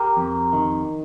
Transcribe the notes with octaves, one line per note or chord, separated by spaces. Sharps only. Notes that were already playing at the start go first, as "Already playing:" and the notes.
Already playing: G4 A#4
F2
D#3